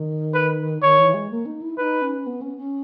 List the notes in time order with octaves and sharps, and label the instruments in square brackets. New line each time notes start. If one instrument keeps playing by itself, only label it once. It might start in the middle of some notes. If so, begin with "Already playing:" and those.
Already playing: [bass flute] D#3
[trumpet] B4
[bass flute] D#3 [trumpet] C#5
[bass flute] E3
G#3
A#3
D#4
E4
[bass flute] D#4 [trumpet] B4
[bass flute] C#4
B3
C#4
C#4